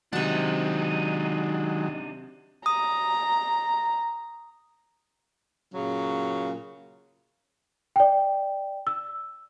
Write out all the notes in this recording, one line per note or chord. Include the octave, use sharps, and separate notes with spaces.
C3 D#3 F#3 G#3 D4 D#4 F#5
A#5 D#6
A#2 C#3 F#3
D5 G5
E6